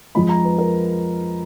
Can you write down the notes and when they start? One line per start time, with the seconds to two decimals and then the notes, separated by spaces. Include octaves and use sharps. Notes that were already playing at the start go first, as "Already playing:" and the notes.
0.15 F2 F3 G#3 B5
0.29 A#5
0.45 B4
0.59 A#4